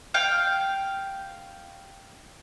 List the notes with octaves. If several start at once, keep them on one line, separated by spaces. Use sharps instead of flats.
F5 G5